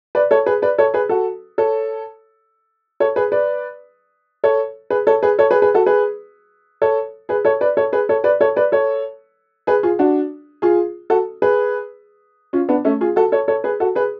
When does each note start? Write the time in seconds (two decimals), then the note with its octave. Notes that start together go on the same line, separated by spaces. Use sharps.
0.15 B4 D5
0.31 A4 C#5
0.46 G#4 B4
0.62 B4 D5
0.78 A4 C#5
0.94 G#4 B4
1.09 F#4 A4
1.58 A4 C#5
3.00 A4 C#5
3.16 G#4 B4
3.32 B4 D5
4.44 A4 C#5
4.90 G#4 B4
5.07 A4 C#5
5.23 G#4 B4
5.39 A4 C#5
5.51 G#4 B4
5.62 G#4 B4
5.74 F#4 A4
5.86 G#4 B4
6.82 A4 C#5
7.29 G#4 B4
7.45 A4 C#5
7.61 B4 D5
7.77 A4 C#5
7.93 G#4 B4
8.09 A4 C#5
8.24 B4 D5
8.41 A4 C#5
8.56 B4 D5
8.72 A4 C#5
9.67 G#4 B4
9.83 F4 G#4
9.99 D4 F#4
10.62 F4 G#4
11.10 F#4 A4
11.42 G#4 B4
12.53 C#4 F4
12.69 B3 D4
12.85 A3 C#4
13.01 F4 G#4
13.16 F#4 A4
13.32 A4 C#5
13.48 A4 C#5
13.64 G#4 B4
13.80 F#4 A4
13.95 G#4 B4